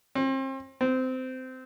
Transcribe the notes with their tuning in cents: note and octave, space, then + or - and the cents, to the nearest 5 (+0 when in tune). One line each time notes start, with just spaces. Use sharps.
C4 +35
C4 -20